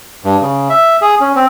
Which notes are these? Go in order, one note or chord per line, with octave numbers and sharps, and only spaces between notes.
G2
C#3
E5
G#4
C#4
C4